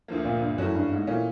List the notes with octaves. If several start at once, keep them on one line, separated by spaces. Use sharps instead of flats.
D2 D3 F3 A#3
A#2
G2
F#2 E3 A3 C#4 F#4
G2
G#2
A#2 E3 A3 C#4